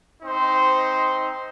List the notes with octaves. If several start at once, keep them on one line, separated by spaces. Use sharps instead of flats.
C4 D#4 C5